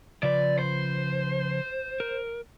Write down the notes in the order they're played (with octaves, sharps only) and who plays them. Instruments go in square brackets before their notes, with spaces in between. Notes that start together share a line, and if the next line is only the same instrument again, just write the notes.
[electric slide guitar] C#3 F3 B4 [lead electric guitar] D5
[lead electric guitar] C5
[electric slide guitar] A#4